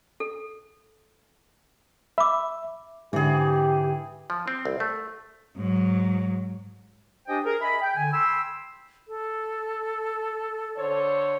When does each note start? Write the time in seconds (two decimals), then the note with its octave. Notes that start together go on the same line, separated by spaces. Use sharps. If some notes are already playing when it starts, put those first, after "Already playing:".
0.20 A4
2.18 E5 B5 D6
3.13 G#2 D3 E3 G4 G#4
4.30 F3
4.48 C4
4.65 C2
4.80 A3
5.57 G#2 F#3
7.28 D4 G4 C5 D#5 G5 G#5
7.45 G#4 A#4
7.61 D#5 E5 G#5 B5
7.82 G5
7.96 D3 G#5
8.12 G5 B5 C6 E6
9.08 A4
10.76 D3 C5 C#5